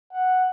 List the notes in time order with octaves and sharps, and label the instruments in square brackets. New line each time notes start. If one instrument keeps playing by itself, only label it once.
[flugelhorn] F#5